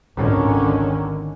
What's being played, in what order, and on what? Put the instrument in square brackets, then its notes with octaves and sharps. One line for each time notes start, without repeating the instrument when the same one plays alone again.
[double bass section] G#1 C#2 D3 D#3 C#4